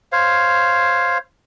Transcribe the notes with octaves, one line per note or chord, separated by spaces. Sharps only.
C5 C#5 F5